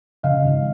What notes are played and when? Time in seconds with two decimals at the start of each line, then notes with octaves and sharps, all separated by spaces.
0.23 C#3 D#5 F5
0.44 G#1